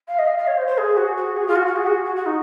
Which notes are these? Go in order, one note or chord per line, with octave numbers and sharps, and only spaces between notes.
F5
D#5
F5
F5
C#5
C5
C5
G#4
F#4
F#4
G#4
F4
F#4
F#4
G#4
F#4
F#4
F#4
D#4